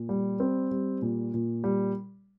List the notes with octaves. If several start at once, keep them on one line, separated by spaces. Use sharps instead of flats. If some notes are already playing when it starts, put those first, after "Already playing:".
Already playing: A#2
G3
C4
G3
A#2
A#2
G3